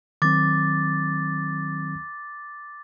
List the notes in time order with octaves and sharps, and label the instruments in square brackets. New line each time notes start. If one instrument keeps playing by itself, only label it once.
[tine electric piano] D#3 F#3 C4 [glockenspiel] D6 A6